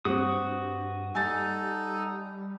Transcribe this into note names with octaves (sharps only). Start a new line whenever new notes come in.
G2 G3 C4 F#4 D#6
G3 D#4 A4 G#5 A6